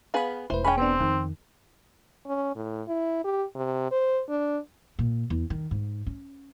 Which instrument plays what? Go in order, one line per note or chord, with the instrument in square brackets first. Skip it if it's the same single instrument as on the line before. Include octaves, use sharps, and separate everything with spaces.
[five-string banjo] B3 G#4 B4 [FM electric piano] F5 B5
[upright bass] E1 A3 [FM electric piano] E4 B4 [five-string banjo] C5
[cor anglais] C#4 [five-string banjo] G#4 G5 [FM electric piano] B5
[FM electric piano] B3 D4 [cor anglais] C4
[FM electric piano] F2 D#3 [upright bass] B3
[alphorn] C#4
A2
E4
G4
C3
C5
D4
[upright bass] A#2
E2
D#3
G#2
C#4